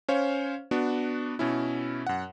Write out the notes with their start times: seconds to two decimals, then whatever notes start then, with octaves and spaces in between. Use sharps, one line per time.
0.08 C#4 C5 C#5 F5
0.71 B3 D4 F#4
1.39 B2 C#4 E4
2.07 F#2 F#5